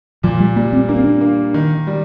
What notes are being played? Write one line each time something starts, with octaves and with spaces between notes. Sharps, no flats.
A#2 F3
G3
G3 A#3
C4
A#3 D4
C4
D4
A#3
D#3
G3